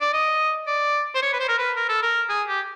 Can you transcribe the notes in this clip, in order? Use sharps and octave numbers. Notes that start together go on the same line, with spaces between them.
D5
D#5
D5
C5
C#5
B4
C5
A#4
B4
A#4
A4
A#4
G#4
G4